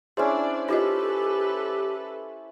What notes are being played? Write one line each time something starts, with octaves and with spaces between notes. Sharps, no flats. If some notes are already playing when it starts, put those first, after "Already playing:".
C#4 D4 E4 G#4 C5 D5
D#4 F4 G4 A4 B4 D#5